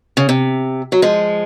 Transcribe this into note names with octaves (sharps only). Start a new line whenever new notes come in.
C#3
C3
F#3
F3 G#3